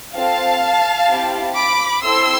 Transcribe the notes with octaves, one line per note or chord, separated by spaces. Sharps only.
C4 F4 A4 F5 A5
C4 E4 G4
B5 D6
C4 E4 A4 C6 E6